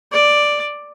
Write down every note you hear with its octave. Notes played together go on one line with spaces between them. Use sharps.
D5